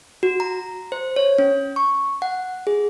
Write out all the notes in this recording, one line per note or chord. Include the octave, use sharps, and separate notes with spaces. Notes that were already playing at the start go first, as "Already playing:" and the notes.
F#4
A#5
C5
C#5
C#4
C#6
F#5
G#4